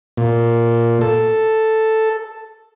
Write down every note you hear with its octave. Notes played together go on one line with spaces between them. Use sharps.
A#2
A4